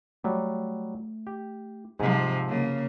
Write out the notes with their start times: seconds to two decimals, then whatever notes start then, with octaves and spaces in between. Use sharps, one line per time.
0.24 F#3 G3 A3
1.27 G4
2.00 G#2 C3 F3 G#4
2.48 C#3 A#3